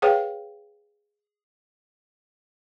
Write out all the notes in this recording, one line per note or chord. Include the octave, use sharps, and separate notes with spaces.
G#4 B4 C#5 F5 G5